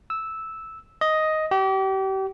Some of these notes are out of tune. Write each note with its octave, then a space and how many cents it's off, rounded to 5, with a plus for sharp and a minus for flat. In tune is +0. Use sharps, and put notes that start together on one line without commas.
E6 -10
D#5 +5
G4 -35